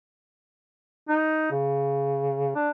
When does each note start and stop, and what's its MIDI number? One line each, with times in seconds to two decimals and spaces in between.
1.09 1.47 63
1.51 2.55 49
2.55 2.70 62